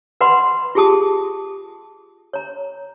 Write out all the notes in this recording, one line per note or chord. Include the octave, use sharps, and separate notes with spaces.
B4 D5 F#5 B5 C6
F4 G4 G#4 A5 D#6
C#5 A#5